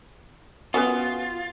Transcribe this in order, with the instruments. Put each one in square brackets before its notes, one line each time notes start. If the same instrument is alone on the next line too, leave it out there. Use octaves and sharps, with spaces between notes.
[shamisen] B3 C#4 F#4 [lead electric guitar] F4